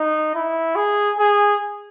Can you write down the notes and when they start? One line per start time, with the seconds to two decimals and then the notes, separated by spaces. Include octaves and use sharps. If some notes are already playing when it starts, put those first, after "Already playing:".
Already playing: D#4
0.35 E4
0.76 G#4
1.18 G#4